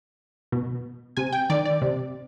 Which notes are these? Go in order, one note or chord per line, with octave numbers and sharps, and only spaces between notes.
B2
C3 G#5
G5
D#3 D5
D5
C3